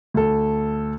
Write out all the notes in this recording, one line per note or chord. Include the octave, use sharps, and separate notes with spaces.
D2 A4